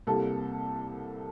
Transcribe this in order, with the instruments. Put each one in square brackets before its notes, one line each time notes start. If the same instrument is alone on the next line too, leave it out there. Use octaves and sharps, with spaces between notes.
[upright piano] C2 C3 G3 A#3 A4